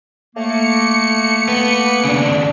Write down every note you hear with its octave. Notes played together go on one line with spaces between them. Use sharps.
A3 A#3 C#7
B3
C#3 D4